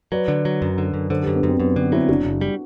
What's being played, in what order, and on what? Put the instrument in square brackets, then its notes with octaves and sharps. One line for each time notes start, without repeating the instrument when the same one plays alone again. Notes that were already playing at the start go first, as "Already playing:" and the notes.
[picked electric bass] F#3 [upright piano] B4 D5
[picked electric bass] D3
F#3
F#2
D3
F#2
[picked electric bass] D3 [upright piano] A4 C5
[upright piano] G4 B4
[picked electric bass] F#2
[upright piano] B3 D4
[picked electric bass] F#2 [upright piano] C4
[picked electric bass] F#2 [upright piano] B3
[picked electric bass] D3 [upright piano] C4
[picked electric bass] F#3 [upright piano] C4 E4
[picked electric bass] F#1 [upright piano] D4 F#4
[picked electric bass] F#1
G3